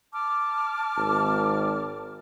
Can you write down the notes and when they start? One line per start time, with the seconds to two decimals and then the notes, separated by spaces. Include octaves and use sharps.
0.13 A5 D6 F6
0.97 G#1